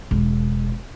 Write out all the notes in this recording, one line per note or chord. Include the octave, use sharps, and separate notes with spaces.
E1